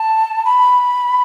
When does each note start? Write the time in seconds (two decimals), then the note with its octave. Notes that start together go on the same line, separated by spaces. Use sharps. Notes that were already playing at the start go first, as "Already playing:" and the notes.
Already playing: A5
0.45 B5